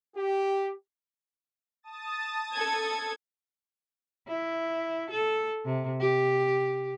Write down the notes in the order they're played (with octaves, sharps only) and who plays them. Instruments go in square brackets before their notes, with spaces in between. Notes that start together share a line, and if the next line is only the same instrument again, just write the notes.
[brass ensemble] G4
[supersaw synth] A5 D#6 A6
[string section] A4 G#6
[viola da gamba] E4
A4
C3
G4